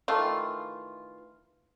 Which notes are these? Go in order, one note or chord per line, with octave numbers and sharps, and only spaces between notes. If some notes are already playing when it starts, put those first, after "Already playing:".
D#3 E3 A3 F4